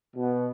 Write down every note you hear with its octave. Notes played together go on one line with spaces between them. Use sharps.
B2